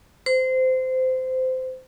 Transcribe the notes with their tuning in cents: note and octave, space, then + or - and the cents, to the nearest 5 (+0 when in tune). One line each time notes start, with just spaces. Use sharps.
C5 -20